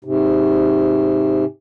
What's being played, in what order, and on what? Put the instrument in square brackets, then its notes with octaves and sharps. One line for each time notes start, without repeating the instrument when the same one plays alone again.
[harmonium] G#2 C3